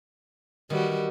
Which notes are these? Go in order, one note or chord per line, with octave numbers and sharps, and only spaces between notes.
D#3 E3 G3 F#4